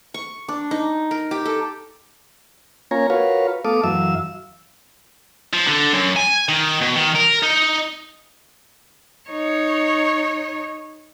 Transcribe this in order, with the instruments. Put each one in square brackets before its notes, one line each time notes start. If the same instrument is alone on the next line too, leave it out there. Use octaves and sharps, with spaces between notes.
[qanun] C#6
D4
D#4
A#4
G4
A4
[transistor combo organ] A#3 C#4 F4 C#5 G#5 A#5
F4 F#4 A#4 B4 C#5 F5
A3 B3 A4 F5 D6 D#6
F#2 E3 F#3 E5 F5 E6
[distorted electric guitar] F3
D3
F#2
G#5
D#3
B2
D#3
A#4
D#4
[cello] D#4 C#5